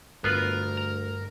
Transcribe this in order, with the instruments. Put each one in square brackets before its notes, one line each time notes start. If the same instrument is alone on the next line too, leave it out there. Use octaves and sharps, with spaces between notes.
[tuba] D2 [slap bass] G2 [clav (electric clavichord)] B3 F4 B4 [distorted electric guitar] A#4
[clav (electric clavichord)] A#5